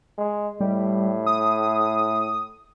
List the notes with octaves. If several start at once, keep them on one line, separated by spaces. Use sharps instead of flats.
G#3
A2 G3
D#6